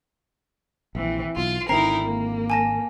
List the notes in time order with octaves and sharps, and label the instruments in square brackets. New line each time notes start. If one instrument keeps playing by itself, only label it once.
[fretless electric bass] A#1 [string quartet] E3 C4
[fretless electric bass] B1 [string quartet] F4
[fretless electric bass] G#1 D3 C4 [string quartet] D#4 E4 A#4 [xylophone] A#5 C7
[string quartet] A#3
[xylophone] G#5 A5 A#6